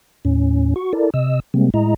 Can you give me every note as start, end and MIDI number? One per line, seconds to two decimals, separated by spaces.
0.25 0.74 39
0.25 0.74 45
0.25 0.74 61
0.76 0.93 66
0.76 0.93 85
0.93 1.10 64
0.93 1.10 69
0.93 1.10 70
0.93 1.10 74
1.14 1.40 48
1.14 1.40 75
1.14 1.40 88
1.54 1.70 48
1.54 1.70 55
1.54 1.70 56
1.54 1.70 58
1.54 1.70 60
1.74 1.94 45
1.74 1.94 56
1.74 1.94 64
1.74 1.94 75
1.74 1.94 82